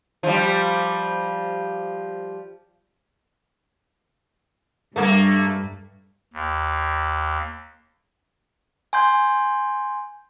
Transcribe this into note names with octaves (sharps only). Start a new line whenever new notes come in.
F3 G3
G2 A3 A#3
D#2
G#5 C6 G6